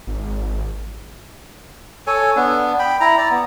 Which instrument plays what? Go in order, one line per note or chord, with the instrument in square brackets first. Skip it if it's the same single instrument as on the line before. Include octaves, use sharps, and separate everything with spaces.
[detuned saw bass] G#1
[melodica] A4 C#5 G#5
B3 D4
G5 B5
E4 A#5
D5 A#5
B3